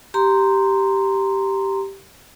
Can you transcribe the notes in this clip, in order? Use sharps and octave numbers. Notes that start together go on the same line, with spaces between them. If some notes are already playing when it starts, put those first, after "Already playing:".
G4 A#5 C6